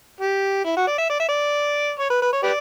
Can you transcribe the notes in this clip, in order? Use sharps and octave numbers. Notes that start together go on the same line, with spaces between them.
G4
E4
F#4
D5
E5
D5
E5
D5
C#5
B4
B4
C#5
G4 B4 D5